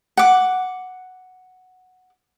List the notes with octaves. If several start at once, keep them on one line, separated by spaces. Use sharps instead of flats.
F#5 D6